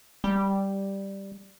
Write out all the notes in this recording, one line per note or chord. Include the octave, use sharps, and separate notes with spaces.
G3